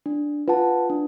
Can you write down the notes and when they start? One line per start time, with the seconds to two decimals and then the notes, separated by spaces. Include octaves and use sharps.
0.06 D4
0.48 F4 B4 F#5 A5
0.90 D4